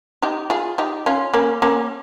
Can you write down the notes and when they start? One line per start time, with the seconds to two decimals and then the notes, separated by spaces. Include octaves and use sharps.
0.22 D#4 G4
0.50 F4 G#4
0.78 D#4 G4
1.06 C#4 F4
1.34 A#3 C#4
1.62 A#3 C#4